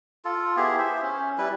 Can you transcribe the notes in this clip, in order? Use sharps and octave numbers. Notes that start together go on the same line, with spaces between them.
F4 A4
B3 E4 G4 G#4
C5 E5
C#4
G3 E4 B4